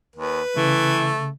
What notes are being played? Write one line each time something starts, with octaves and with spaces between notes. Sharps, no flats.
D#2 B4
C#3 E3 A3